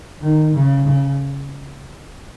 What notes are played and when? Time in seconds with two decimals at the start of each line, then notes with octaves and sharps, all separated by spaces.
0.22 D#3
0.55 C#3
0.87 C#3